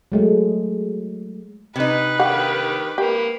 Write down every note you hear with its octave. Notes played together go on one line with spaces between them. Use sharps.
F#3 G#3 A3
C3 D#4 B4
D3 D#3 G4 F5 F#5
A#3 G4 B4